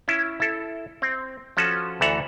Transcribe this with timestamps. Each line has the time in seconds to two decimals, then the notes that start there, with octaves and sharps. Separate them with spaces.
0.08 C#4 E4
0.40 E4 A4
1.02 C4
1.57 F3 C#4 F#4 A4
2.01 D2 E3 A4 E5 F#5 A#5